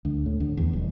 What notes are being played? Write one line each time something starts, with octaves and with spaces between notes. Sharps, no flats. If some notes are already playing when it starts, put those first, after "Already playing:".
D2
A2
D2
E2
D#1